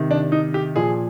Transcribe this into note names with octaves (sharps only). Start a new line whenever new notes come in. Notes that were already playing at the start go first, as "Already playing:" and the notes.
Already playing: C3 D#3
D4
D#4
G4
A#2 F3 G#4